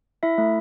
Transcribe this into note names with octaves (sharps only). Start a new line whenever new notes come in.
E4 E5
A3